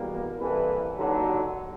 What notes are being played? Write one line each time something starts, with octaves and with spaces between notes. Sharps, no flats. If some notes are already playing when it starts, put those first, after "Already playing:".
Already playing: E2 B2 G3 A#3
C2 C3 E3 G3 A#3 A4 B4
D#2 D3 F#3